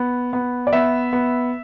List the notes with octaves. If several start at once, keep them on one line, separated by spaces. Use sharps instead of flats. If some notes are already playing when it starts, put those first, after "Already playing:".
Already playing: B3
B3
D5
B3 E5
B3